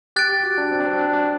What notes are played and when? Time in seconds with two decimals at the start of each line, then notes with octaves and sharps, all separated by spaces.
0.16 G4 F#6 A6 D7
0.30 G4
0.43 F#4
0.58 D4
0.71 C4
0.80 D4
0.85 C4
0.99 D4
1.13 D4